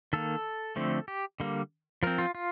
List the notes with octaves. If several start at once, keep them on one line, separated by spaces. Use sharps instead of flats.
D#3 A#3 A4
D3 F3 A3 C4
G4
D3 G3 A#3
F3 C4 A#4
F4
F4